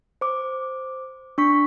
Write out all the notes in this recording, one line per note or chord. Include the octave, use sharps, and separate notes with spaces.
C5 D6
D4 C#6 B6